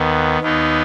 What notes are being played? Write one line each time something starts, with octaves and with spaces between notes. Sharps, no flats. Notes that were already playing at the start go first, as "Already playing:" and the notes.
Already playing: D#2 D#3 B3
D#2 D#3 B3 D#4